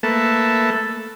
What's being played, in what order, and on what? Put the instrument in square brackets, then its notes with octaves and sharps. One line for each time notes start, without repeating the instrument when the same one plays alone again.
[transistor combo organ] A3 A#3 A4 B4 E5